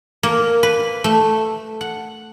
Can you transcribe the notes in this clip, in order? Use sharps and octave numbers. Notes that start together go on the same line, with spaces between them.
A#3
B4
A3
F#5